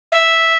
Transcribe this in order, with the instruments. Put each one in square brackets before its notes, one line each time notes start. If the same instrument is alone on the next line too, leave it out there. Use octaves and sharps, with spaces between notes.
[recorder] E5